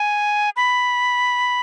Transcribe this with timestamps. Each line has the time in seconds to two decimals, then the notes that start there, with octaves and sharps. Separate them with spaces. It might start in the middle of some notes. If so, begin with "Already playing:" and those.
Already playing: G#5
0.56 B5